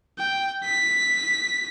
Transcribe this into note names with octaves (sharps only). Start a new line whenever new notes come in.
G5
B6